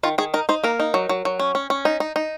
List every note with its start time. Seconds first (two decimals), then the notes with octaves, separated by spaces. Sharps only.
0.03 D#3 F4
0.18 D#3 G#4
0.34 D#4 A#4
0.49 D#4 C5
0.63 A#3 A#4
0.80 D#4
0.94 F#3
1.09 F#3
1.25 F#3
1.39 C#4
1.55 C#4
1.70 C#4
1.85 D#4
2.00 D#4
2.16 D#4